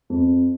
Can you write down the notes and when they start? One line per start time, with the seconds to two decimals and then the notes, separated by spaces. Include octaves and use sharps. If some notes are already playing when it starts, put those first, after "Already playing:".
0.10 F2